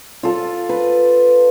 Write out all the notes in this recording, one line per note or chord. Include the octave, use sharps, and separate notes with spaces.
F4 A4
B4